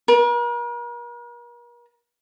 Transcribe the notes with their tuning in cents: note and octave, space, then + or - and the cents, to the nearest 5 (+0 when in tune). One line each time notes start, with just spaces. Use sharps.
A#4 +45